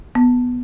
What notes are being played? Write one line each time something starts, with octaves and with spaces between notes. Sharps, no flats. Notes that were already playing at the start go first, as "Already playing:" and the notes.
B3